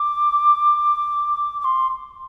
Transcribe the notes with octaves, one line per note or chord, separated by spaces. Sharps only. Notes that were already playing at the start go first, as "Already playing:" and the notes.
Already playing: D6
D6
C6